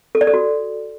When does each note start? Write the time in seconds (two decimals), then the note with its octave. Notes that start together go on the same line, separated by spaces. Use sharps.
0.15 A4
0.21 D5
0.27 A4
0.34 F#4